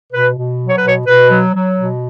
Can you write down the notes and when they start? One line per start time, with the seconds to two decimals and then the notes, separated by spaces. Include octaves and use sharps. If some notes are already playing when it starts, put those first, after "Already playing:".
0.12 B2 B4
0.36 B2
0.60 F#3
0.69 C#5
0.78 B4
0.83 B2 C#5
1.07 B2 B4
1.30 F#3
1.54 F#3
1.77 B2